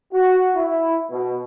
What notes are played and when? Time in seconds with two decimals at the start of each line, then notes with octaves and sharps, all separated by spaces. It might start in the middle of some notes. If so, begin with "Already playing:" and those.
0.12 F#4
0.56 E4
1.11 B2